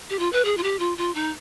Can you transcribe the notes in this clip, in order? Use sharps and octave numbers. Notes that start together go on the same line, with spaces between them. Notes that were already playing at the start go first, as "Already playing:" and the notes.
G4
F4
B4
G#4
F4
G4
F4
F4
D#4